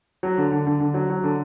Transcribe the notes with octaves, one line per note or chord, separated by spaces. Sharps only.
F#3
D3
D3
D3
D3
F#3
F#3
D3